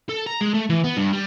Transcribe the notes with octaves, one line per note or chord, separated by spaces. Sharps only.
A4
A#5
G#3
A3
E3
B3
G2
G3